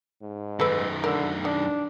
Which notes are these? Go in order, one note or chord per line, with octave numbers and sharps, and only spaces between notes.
G#2
F#2 D#3 A4 B4
D3 A4 A#4
D4 D#4